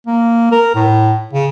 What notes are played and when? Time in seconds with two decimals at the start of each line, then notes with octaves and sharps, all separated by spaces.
0.07 A#3
0.52 A#4
0.75 A2
1.33 C#3